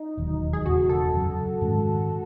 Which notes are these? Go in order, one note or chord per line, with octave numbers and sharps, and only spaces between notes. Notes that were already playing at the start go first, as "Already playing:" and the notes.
Already playing: D#4
E1 D#2 D#3 F#3
G#4
E1 E2 C#3 F#4
A4
F#2 C#3 F#3
G#2 D#3 G#3 C#4